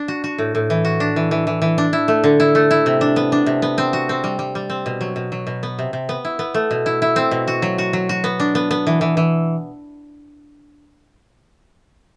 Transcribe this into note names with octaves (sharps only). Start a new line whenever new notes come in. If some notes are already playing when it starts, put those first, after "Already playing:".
Already playing: D4
F#4
F#4
A2
A2
E3
F#4
D4
E3
E3
E3
E3
D4
E4
A3
D3
E4
A3
E4
C3
D4
B3
D4
C3
B3
C4
F#4
C4
G3
G3
G3
C4
B2
F#3
B2
F#3
B2
B3
C3
C3
B3
E4
B3
A3
B2
E4
E4
C4
B2
F#4
F#3
F#4
F#3
F#4
B3
D4
B3
B3
E3
E3
E3